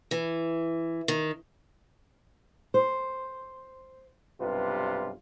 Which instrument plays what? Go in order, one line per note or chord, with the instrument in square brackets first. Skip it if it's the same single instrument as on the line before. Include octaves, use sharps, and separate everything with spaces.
[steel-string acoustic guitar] E3
D#3
C5
[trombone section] B1 G2 C3 F4 B4